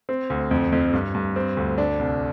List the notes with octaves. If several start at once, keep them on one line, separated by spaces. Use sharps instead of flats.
C4
D2
F2
F2
G2
G2
C4
D2
D4
C2